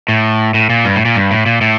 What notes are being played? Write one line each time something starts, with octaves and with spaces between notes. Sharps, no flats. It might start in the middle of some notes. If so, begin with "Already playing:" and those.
A2
A2
A#2
G2
A2
A#2
G2
A2
A#2
A2